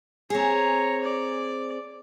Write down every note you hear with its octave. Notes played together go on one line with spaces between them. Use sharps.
C4 G#4 C#5 A#5
D5